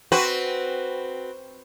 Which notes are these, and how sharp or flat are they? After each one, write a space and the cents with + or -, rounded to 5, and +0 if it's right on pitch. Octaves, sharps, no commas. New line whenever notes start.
C4 +0 F#4 +0 B4 +0